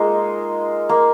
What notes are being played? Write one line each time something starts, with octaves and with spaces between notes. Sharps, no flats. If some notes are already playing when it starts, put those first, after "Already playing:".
Already playing: G#3 A#3 D#4 F4
A#3